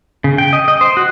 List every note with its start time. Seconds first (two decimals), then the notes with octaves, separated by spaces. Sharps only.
0.24 C#3
0.38 G5
0.53 D#5
0.68 D#5
0.81 C5
0.97 F#4